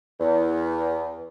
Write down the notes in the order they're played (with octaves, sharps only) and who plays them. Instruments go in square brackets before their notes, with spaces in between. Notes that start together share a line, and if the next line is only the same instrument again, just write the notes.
[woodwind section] E2